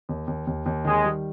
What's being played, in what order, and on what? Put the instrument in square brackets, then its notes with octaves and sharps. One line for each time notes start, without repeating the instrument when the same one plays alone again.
[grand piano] D#2
D#2
D#2
D#2
[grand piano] D#3 [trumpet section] G#3
[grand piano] G3